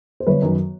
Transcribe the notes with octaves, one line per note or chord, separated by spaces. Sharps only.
C5
G1 B4 C#5
F#2 D#3